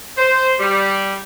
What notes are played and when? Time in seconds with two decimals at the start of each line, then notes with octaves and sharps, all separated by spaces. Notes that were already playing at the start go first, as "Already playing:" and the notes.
0.16 C5
0.59 G3